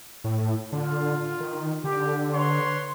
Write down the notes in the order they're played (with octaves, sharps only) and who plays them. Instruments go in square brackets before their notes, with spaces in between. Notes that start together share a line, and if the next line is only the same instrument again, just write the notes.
[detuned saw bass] A2
[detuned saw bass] D3 [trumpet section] F4
[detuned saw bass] D#3
[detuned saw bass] D3 [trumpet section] G4
[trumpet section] B4 C#5 C6